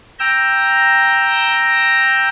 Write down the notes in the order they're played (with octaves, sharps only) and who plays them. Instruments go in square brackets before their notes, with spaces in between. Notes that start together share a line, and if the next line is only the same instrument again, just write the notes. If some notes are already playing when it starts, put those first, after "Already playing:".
[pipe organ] G5 A#5 E6